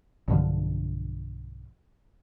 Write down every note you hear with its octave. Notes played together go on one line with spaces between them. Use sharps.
B1 G2 D3 F3